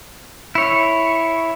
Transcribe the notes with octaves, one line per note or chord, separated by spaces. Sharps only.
E4 C#5